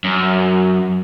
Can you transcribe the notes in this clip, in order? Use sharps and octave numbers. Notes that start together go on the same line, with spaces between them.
F#2